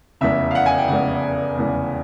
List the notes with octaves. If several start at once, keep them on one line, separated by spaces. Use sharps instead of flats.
F1 E2 C#3 E5
F5
F#5
G#5
G5
F1 E2 C#3 F#5
F1 E2 C#3